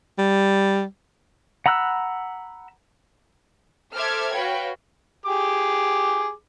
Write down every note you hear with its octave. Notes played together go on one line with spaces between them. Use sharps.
G3
F#5 A#5 B5 E6 F#6
A4 C5 E5 D6 F6 G#6
F#4 B4 C#5 F5 G5
G4 G#4 D6